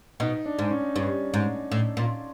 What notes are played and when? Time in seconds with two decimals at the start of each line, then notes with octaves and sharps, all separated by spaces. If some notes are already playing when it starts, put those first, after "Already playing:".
0.20 B2 D#4
0.45 D4
0.59 G#2
0.71 C#4
0.96 G2 C#4
1.34 G#2
1.72 A2
1.97 A#2